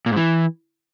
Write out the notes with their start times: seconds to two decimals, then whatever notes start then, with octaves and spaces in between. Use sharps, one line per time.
0.06 A#2
0.11 G#2
0.17 E3